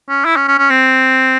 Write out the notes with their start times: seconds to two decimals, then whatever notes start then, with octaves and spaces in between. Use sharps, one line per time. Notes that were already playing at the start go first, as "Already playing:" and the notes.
0.09 C#4
0.25 E4
0.36 C#4
0.48 C#4
0.59 C#4
0.70 C4